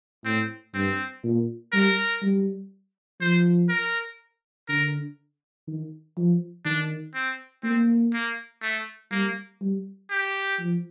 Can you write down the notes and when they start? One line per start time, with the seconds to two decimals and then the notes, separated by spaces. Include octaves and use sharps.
0.25 A2 C4
0.74 G2 C4
1.24 A#2
1.73 G3 A#4
2.22 G3
3.21 F3 C5
3.69 A#4
4.69 D3 A#4
5.67 D#3
6.17 F3
6.65 D#3 D4
7.15 C4
7.64 A#3 C4
8.14 A#3
8.62 A3
9.12 G3 A#3
9.61 G3
10.11 G4
10.59 F3